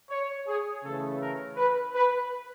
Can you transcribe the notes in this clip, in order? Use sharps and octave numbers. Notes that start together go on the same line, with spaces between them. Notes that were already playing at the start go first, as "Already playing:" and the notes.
C#5
G#4
C#3 E3 A3 A4
A#4
B4
B4